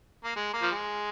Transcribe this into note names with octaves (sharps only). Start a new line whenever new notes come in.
A#3
G#3
A#3
F3
G#3